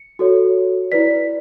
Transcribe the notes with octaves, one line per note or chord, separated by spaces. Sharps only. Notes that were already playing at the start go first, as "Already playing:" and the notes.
Already playing: C#7
F#4 A4 C#5
E4 B4 D5 B6